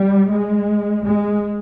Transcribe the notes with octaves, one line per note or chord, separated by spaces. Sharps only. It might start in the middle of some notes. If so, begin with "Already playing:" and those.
Already playing: G3
G#3
G#3